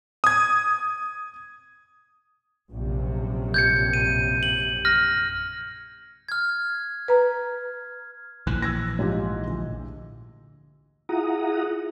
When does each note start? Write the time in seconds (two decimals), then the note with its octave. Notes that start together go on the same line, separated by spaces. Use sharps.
0.24 D#6 G#6
2.72 A#1 F#2 C3
3.54 G6 G#6 C#7
3.93 D#7
4.43 F#7
4.85 F6 A#6
6.29 F6 G#6
7.08 B4 A#5
8.47 A#1 A#2 E3 F#6
8.62 E6 G#6 A#6
8.99 G#2 F3 G4
9.47 D2
11.09 E4 F4 G#4 F#5 A#5 D#6